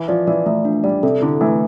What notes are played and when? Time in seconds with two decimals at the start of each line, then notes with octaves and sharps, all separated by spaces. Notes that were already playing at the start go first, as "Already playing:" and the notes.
Already playing: E3
0.08 F3 D5
0.27 E3 D5
0.46 E3 A3
0.65 F3 D4
0.84 G3 D5
1.03 C3 A4
1.22 D3 E4
1.41 E3 A3